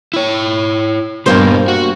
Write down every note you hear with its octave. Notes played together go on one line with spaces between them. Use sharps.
E4 C#5
G2 A#2 A#3 B3 C5
F#4